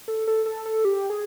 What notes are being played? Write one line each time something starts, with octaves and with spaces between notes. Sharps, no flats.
A4
A4
A4
A4
G4
G#4